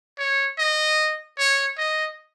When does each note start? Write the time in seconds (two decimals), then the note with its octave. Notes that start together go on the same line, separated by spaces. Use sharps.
0.18 C#5
0.58 D#5
1.38 C#5
1.78 D#5